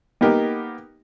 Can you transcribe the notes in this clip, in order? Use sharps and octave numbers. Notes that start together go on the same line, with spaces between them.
A#3 B3 D#4 G4 A#4